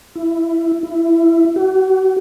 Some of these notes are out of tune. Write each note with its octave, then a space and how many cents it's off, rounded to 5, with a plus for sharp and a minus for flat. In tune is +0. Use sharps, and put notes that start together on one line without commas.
E4 +10
E4 +15
F#4 +40